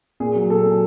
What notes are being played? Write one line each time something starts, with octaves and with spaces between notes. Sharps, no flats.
A#2 G#4
F#3
A#2 A4
F#3